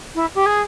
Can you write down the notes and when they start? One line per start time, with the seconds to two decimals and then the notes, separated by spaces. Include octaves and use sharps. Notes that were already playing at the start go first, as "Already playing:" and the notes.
0.15 E4
0.35 G4
0.46 G#4